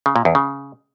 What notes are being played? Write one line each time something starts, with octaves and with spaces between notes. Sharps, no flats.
C#3
A#2
E2
C#3